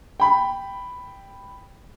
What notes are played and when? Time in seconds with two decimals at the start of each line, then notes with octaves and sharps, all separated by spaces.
0.20 G5 B5